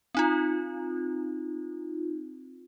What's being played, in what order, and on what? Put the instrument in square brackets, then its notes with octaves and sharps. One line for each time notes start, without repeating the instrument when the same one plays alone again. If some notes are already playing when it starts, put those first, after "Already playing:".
[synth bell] C4 D#4 F4